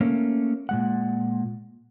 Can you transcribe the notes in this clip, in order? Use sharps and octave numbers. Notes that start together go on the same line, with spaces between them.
A3 A#3 C#4
A#2 G#3 F#5